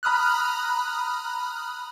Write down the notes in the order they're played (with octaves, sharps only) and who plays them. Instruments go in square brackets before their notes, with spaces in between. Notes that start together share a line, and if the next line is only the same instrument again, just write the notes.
[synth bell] A#5 B5 D#6 F6 F#6